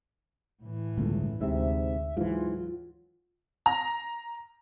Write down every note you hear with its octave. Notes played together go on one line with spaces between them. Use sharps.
A2 E3
G1 C#2 A3
D2 G#2 C3 E5
G#2 E3 F#3 F4
A#5